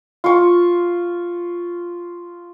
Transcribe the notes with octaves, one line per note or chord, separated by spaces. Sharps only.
F4 C#6